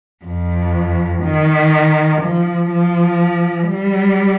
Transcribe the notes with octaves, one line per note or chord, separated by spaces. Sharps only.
F2
D#3
F3
F3
G3